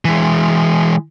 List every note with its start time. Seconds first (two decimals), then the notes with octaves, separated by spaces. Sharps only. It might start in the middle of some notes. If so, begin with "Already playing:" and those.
0.05 E3 G#3